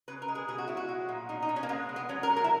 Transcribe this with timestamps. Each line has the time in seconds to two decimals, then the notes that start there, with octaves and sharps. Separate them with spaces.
0.08 C#3 B4
0.22 A#4
0.28 G#3
0.35 G#4
0.48 B2 G#4
0.58 F#4
0.68 F#3 E4
0.77 F#4
0.89 G#3
1.09 A#2
1.29 B2 D#4
1.42 D#4
1.49 B2
1.56 C#4
1.63 A#3
1.69 G#3 B3
1.89 G#3
1.96 B3
2.09 F#3 C#4
2.23 A#4
2.30 F#3
2.36 A#4
2.44 E4